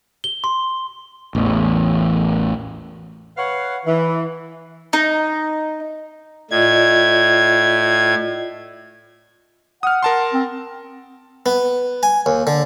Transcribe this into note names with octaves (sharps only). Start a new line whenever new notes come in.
G7
C6
A1 E2
B4 C#5 F5 F#5
E3
D#4
A2 F4 D5 D#5 G#6
F#5 D#6 F6
A#4 A5 C6
C4
B3
G#5
D#2
D3